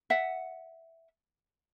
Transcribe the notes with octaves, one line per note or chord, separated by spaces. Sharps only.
E5 F#5